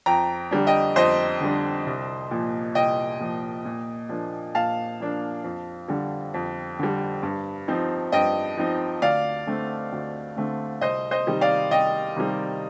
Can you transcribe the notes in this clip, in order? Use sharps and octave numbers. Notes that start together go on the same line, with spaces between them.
F2 G5 A#5
D3 G3 D4
D#5 G5
F2 C5 D#5
D3 G3 D4
C2
A#2 F3
C2 D#5 G5
A#2 F3
A#2
F3 A#3 D4
A#2 F5 A5
F3 A#3 D4
F2
D3 G3
F2
D3 G3
G2
F3 C4 D#4
G2 D#5 G5
F3 C4 D#4
D2 D5 F5
D3 A3 C4
D2
D3 A3 C4
C2 C5 D#5
C5 D#5
C3 D#3 G3
D5 F5
C2 D#5 G5
C3 D#3 G3